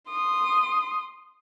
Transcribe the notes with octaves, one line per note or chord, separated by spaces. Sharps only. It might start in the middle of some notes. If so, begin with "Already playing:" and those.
C6 D#6